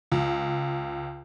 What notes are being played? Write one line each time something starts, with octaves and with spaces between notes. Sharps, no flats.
C#2